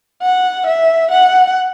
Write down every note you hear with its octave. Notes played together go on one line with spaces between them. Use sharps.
F#5
E5
F#5